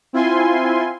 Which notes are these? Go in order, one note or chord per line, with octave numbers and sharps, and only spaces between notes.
C4 E4 F4 G#5 C6